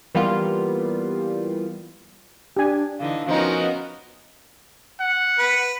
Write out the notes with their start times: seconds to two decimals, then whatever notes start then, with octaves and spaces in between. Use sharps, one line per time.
0.15 E3 G3 A#3 B3 F4
2.57 D4 G4 G#5
2.99 D3 E3 D#4 F5
3.28 F3 B3 C#4 D#4 F#4 A#4
5.00 F#5
5.39 B4